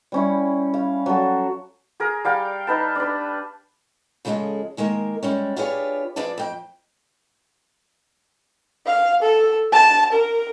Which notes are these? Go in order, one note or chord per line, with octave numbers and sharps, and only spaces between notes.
G3 C#4 E4
F5
F#3 A4
G#4 A#4
G3 F5 G5
D#4 B4 A5
D4 B4
C#3 F3 G#3 F#4 G#4 A4
D#3 G#3 A#3 A#4
G3 G#3 C#4
D4 F4 G4 G#4 B4 C#5
F3 G#4 B4 D5 A5
F2 G5
F5
A4
A5
A#4